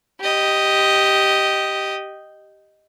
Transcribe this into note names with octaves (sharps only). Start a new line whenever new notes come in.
G4 D#5